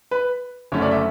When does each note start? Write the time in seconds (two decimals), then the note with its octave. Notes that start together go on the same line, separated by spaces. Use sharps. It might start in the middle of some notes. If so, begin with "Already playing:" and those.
0.11 B4
0.72 F#1 F#2 D3 A3 C#4 C#5
0.82 D5
0.91 E5